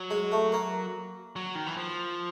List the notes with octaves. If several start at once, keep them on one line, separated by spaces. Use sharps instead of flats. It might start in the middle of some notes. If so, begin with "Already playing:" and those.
Already playing: F#3
G#3
A3
A#3
F#3
D#3
E3
F3